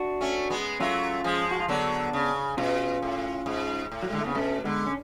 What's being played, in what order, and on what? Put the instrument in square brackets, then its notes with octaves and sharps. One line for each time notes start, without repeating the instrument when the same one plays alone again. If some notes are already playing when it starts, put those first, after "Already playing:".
Already playing: [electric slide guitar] D4 F#4
[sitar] A3 C#4
G#3 B3
[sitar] F#3 A3 [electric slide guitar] C#4 F4
[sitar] F3 G#3
[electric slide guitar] F#4
F4
[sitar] D3 F#3 [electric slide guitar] B3 D4
[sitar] C#3
[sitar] B2 [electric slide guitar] C#4 F4
[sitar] A2
G#2
A2
[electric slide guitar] F#3
[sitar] D3 [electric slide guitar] G#3
[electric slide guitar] A3
[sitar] C#3 [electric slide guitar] B3
[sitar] B2 [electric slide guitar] A3 C#4
[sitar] D3 [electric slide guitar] G#3 B3
[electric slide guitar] C#4